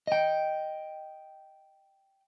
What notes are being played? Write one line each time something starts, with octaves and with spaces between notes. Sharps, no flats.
D#5 G5